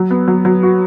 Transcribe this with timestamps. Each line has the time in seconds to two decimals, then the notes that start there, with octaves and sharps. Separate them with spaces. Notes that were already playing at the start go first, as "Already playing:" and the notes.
Already playing: F#3
0.10 B3
0.28 F#3
0.45 F#3
0.63 F#4